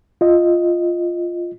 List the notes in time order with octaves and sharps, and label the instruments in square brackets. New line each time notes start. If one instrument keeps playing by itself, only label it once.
[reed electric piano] F4 D#5